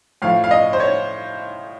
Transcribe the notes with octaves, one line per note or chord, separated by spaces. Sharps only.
A2 F3 F5
F5
D#5
C5
C#5